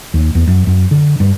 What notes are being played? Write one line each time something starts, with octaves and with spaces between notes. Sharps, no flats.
D#2
E2
F#2
F#2
D3
G2